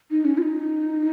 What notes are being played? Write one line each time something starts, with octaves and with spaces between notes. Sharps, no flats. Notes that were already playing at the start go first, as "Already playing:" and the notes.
D#4
C#4
F4
D#4